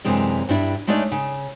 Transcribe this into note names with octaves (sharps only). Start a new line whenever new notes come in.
F#2 C3 E3 G#3 D4
G2 G3 D4 E4
G#3 A3 D4 D#4 C#5 D5
C#3